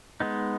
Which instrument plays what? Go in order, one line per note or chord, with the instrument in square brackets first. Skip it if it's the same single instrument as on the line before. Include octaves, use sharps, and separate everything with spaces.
[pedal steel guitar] G#3 B3 D#4